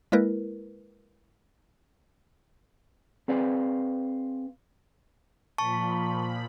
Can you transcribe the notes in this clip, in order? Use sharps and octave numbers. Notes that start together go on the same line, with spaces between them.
G#3 A#3 E4 A#4 B4
C4 G#4 B4 D5 F5
A#2 F3 A5 B5 C#6